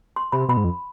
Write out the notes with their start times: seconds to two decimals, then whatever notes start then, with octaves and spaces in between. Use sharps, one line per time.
0.16 C6
0.32 C3 B5
0.48 B2 B5
0.57 G#2
0.64 F2